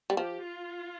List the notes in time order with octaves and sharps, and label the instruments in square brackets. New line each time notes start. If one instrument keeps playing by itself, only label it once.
[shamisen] G3
[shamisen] F3 [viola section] G4
[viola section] F4